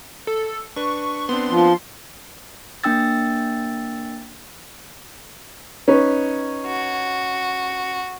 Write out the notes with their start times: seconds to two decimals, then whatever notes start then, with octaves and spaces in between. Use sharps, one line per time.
0.27 A4
0.76 D4 B4 C#6
1.29 B3 C4 D4 C6
1.50 F3
2.84 A#3 D4 G5 E6 A6
5.88 C#4 D#4 B4
6.66 F#4